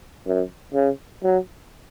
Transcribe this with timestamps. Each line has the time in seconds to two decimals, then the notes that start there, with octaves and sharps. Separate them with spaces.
0.27 F#2
0.74 C#3
1.23 F#3